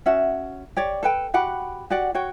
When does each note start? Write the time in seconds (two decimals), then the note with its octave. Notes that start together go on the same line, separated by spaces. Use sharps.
0.06 C#4 F#4 E5 F#5
0.77 G4 C#5 D5
1.03 A4 B4 G5
1.34 F#4 G4 F#5 B5
1.90 F#4 G4 D5 F#5
2.15 F#4 C#5 G5